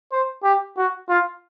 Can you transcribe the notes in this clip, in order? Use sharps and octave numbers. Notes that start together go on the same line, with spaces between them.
C5
G4
F#4
F4